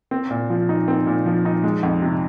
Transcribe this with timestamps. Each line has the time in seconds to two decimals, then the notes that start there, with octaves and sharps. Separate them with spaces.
0.11 C4
0.30 A#2
0.50 F3
0.69 D#4
0.88 C4
1.07 A#2
1.26 F3
1.45 D#4
1.64 G#3
1.83 F2
2.02 C3